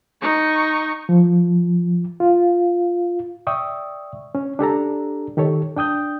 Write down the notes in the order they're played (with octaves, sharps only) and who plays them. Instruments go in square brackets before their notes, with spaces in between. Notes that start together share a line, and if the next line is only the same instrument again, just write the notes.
[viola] D#4 C#6
[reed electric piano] F3
F4
D5 E5 G5 C#6 D#6 E6
C#4
D4 G4 A4 A#5
D#3 G4 A4 C#5
D4 G5 D#6 G6